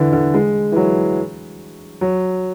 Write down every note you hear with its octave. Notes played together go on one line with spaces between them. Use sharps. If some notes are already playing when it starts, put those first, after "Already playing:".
Already playing: D3 E3
D3
G#3
E3
F#3
F#3